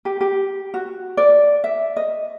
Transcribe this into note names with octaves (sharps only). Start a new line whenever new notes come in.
G4
G4
F#4
D5
E5
D#5